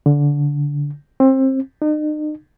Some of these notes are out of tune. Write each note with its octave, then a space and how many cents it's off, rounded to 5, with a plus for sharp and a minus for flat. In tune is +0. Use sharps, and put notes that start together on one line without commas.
D3 -20
C4 +25
D#4 -40